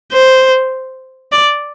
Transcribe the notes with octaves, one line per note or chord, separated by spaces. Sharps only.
C5
D5